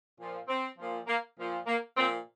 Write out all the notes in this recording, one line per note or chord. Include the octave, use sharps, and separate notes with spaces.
A#2 F3
C4
A#2 F3
A#3
A#2 F3
A#3
A#2 F3 C4